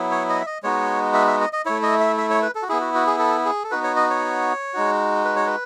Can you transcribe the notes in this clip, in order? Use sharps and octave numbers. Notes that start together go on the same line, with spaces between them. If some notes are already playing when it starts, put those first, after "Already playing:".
Already playing: F#3 B3 E4
C#5
D#5
E5
D#5
G#3 B3 D#4 F#4 C#5
E5
E5
D#5
D#5
A3 E4 C#5
D#5
E5
E5
C#5
B4
A4
F#4
B3 E4 G#4
F#4
F#4
G#4
A4
G#4
A4
B3 D#4 F#4 B4
C#5
D#5
C#5
G#3 D#4 F#4
B4
C#5
B4